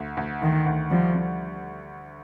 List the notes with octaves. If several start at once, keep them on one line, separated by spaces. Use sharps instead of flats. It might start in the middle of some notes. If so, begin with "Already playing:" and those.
Already playing: D2
D2
D2 D#3
D2
F3 G3
G3